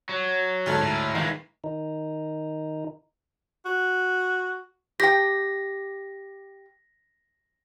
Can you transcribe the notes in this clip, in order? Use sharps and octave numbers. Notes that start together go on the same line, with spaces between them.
F#3
D2 G#2 A4
A2
D#3 E3 G#3 A#3
D#3 D#4
F#4
G4 G5 A#6 B6